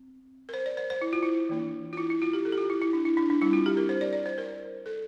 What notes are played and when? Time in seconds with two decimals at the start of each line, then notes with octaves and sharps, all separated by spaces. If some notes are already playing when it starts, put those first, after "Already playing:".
Already playing: C4
0.49 A#4
0.54 C5
0.66 D5
0.77 C5
0.90 C5
1.01 E4
1.13 F4
1.23 E4
1.49 E3 A#3 D4
1.93 F4
1.97 E4
2.10 E4
2.22 F4
2.33 G4
2.45 A4
2.52 G4
2.58 F4
2.70 E4
2.81 E4
2.93 D4
3.05 E4
3.17 D4
3.30 D4
3.42 G3 C4 E4
3.53 F4
3.66 G4
3.77 A#4
3.89 C5
4.01 D5
4.13 D5
4.26 C5
4.38 A#4
4.86 A4